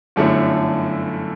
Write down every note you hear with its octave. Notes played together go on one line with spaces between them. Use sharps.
G1 F#2 D3 A3 E4